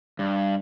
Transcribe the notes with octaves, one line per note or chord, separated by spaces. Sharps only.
G2